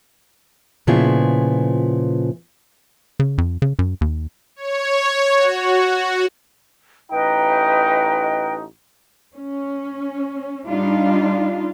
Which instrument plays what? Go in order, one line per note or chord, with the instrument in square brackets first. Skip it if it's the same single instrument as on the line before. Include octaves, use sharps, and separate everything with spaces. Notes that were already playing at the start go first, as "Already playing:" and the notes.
[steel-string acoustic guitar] A#2 C#3 F3 B3 E4 G#4
[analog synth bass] C#3
F2
C#3
F#2
D#2
[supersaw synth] C#5
F#4
[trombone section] A1 D#4 [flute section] B4 D#5 G5
[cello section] C#4
G3 D4 D#4 F4